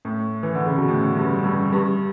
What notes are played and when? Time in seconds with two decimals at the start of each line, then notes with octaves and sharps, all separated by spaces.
0.05 A2
0.43 E3
0.55 D3
0.66 C#3
0.78 B2
0.88 A2
1.17 G2
1.44 G2
1.73 G2